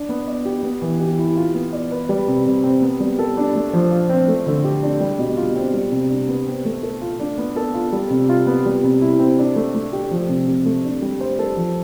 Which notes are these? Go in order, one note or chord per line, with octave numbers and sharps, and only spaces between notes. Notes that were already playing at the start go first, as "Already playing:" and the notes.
Already playing: D4
B3
D5
G4
B3
E3
G4
E4
F4
B3
D5
B4
G3
C3
C3
C4
B3
G3
A4
D4
A3
F3
F4
C4
A3
D3
G4
D4
G3
B2
F4
C4
G3
C3
D4
B3
C4
A3
A4
F4
D4
B3
A4
F4
G3
C3
F4
B3
G3
C3
E4
C4
D4
A3
A3
G4
F3
C3
C3
A3
D4
G3
C5
A4
F3